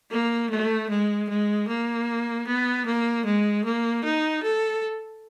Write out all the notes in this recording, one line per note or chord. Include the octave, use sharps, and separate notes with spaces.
A#3
A3
G#3
G#3
A#3
B3
A#3
G#3
A#3
D#4
A4